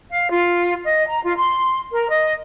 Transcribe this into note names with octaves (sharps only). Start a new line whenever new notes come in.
F5
F4
D#5
A#5
F4
C6
A#4
D#5